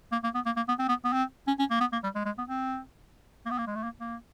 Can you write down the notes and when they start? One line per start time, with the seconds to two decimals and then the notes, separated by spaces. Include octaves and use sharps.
0.12 A#3
0.24 A#3
0.35 B3
0.46 A#3
0.56 A#3
0.68 B3
0.79 C4
0.88 B3
1.04 B3
1.13 C4
1.47 C#4
1.59 C#4
1.71 A#3
1.80 B3
1.93 A#3
2.03 G3
2.15 G#3
2.26 G#3
2.38 B3
2.49 C4
3.46 A#3
3.50 B3
3.58 A#3
3.67 G#3
3.75 A3
3.83 A#3
4.01 A#3